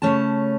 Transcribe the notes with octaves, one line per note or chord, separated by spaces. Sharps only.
C#3 A3 C#4 A5